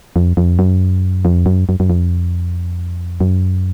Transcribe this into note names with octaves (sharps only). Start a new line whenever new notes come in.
F2
F2
F#2
F2
F#2
F#2
F#2
F2
F#2